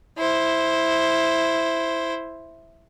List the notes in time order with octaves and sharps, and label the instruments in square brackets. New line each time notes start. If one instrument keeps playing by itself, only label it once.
[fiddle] E4 C5